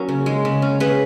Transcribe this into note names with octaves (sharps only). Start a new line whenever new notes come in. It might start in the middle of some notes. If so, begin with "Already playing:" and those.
Already playing: F#3 A#3 C#4
C#3
G#3
C#3
C#4
C#3 G#4 B4